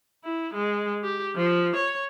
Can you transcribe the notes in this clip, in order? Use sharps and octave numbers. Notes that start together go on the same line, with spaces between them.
E4
G#3
G4
F3
C#5